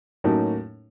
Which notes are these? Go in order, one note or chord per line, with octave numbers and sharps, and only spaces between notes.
A2 F#3 A#3 C#4 D#4